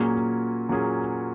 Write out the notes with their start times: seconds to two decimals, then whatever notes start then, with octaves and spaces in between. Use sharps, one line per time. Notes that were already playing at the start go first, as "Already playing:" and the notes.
Already playing: A#2 F#3 A#3 C#4 G#4
0.69 A#2 F#3 A#3 C#4 G#4